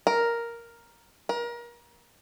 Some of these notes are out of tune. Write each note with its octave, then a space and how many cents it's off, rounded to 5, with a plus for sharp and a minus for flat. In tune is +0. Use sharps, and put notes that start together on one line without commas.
A#4 +0
A#4 +30